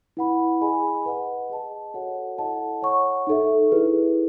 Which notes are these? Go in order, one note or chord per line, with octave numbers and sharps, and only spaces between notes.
E4 B4 F#5 B5
G#4 D#5 G#5 B5
B4 D#5 F#5
G#4 D#5 A5
F#4 A4 C#5 F#5
E4 A4 D#5 F#5 A5
C#5 F#5 C#6
D#4 A4 E5
E4 G#4 B4